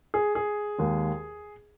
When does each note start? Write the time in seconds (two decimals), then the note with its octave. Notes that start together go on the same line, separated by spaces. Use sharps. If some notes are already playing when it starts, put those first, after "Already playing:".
0.14 G#4
0.35 G#4
0.78 D#2 D#3 G#3